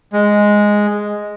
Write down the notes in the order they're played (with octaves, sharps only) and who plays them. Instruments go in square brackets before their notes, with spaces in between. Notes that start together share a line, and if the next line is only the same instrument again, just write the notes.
[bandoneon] G#3